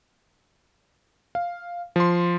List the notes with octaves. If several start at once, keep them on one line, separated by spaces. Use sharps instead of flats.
F5
F3 C6